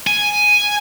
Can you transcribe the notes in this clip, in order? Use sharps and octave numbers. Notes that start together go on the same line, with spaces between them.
G#5